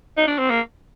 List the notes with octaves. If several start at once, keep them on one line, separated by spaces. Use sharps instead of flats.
D#4
D4
C4
A#3